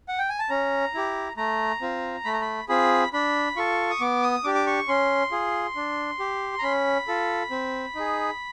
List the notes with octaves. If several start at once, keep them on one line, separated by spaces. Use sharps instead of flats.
F#5
G5
G#5
A5
C#4 A#5
E4 G4
A3 A#5
C4 F4
A3 B5
A#5
B5
C4 F4 G#4 B5
D4 B5
F4 A4 C#6
D#6
B3 D6
D#6
D4 G4 D6
D6
C#6
C#4 C6
F4 G#4
D4
G4
A#5
C#4 B5
F4 A4
C4
D#4 G#4